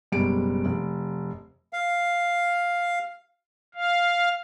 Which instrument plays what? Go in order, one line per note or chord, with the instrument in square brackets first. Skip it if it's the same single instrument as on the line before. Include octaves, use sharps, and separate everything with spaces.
[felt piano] F#1 B2 G3 G#3 D7
F1
[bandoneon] F5
[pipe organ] F5